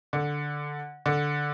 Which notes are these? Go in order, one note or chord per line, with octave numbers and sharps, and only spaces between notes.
D3
D3